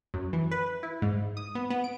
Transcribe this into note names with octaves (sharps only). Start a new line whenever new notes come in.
F#2
E3
B4
E4
G#2
D#6
B3
B3
D7